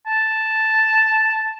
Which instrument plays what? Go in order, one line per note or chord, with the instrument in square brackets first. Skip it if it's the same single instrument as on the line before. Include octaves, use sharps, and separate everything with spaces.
[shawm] A5